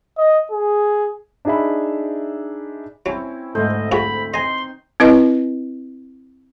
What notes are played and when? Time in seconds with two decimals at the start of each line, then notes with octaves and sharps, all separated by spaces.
0.18 D#5
0.51 G#4
1.45 D4 D#4 G#4 E5 B5
3.06 F#3 C4 C#4 E4
3.55 D2 G#2 A4 C5 D#5 E5
3.92 F2 F#4 G#4 B5
4.34 C4 D#4 D#5 G#5 C6
5.00 C4 E4 B4 D#5